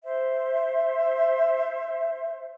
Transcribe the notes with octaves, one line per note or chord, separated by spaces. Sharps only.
C5 E5